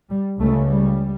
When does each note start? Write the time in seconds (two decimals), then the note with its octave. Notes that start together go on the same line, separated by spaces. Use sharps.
0.10 G3
0.40 C#2 C#3 A3
0.69 G3